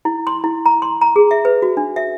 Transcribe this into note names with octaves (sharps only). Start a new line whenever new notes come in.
E4
C6
E4
A#5
C6
A#5
G#4
E5
B4
F#4
D4
E5